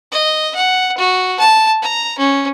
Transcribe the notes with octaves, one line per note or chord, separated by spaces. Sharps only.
D#5
F#5
F#4
A5
A#5
C#4